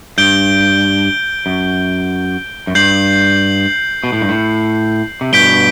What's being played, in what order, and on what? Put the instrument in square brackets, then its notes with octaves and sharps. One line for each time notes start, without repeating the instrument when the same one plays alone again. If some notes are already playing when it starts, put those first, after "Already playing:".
[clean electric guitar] G2 [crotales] G6 D7 G7
[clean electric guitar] F#2
F#2
[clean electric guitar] G2 [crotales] G6 C7 F#7
[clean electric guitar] B2
A2
G2
A2
C3
[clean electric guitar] G2 B2 [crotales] G6 B6 D7 G7